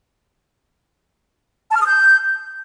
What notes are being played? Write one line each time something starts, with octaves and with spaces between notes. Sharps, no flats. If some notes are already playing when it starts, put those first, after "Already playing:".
A5
F6
D#6
G6